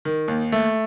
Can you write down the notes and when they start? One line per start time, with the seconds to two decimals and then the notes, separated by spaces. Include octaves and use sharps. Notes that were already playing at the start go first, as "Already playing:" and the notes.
0.05 D#3
0.28 D#2
0.52 A3